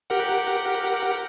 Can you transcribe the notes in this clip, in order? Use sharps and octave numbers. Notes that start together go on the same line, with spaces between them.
G4 A#4 F#5